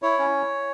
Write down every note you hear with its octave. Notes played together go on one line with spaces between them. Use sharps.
E4 C#5
C#4